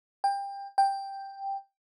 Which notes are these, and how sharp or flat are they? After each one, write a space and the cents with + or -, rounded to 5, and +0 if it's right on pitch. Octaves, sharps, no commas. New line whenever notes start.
G5 +25
G5 +5